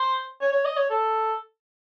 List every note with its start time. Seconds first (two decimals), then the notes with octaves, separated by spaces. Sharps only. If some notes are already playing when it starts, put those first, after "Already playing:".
Already playing: C5
0.41 C#5
0.52 C#5
0.65 D#5
0.77 C#5
0.90 A4